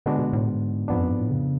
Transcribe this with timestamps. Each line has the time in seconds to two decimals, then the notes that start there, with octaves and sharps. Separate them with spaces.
0.06 B2 D3 G#3 B3 D4 F#4
0.19 B2
0.33 A2
0.47 G#2
0.88 F2 G#2 F3 B3 D4
0.99 F#2
1.09 G#2
1.19 A2
1.30 C#3